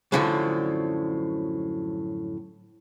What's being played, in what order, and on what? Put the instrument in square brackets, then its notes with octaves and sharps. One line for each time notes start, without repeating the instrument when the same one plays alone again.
[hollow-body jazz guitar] F#2 A2 D3 F3 F#3